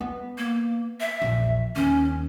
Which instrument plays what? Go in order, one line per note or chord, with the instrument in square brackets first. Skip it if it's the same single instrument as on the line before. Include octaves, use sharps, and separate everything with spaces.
[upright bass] B3
[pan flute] A#3
E5
[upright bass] A#1 E2
[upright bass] D#2 [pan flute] C#4